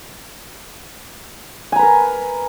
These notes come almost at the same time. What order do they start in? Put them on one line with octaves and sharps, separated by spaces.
G#5 A#5 B4 A#4